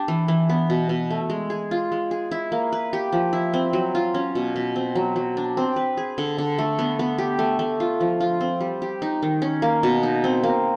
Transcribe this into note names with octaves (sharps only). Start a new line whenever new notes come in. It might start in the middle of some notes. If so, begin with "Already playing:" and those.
Already playing: D4 G4
E3
E3
B3
B2
B2
A3
G#3
G#4
F4
G#3
G#4
E4
A#3
B4
G4
F3
E4
C4
F#3
F4
C#4
B2
B2
C4
F#3
F#3
D4
C4
B4
G#4
D3
D3
A3
B3
B3
G4
A3
A3
F4
F3
F4
C4
G3
G4
D#4
D#3
C#4
A#3
B2
D#4
C4
A#3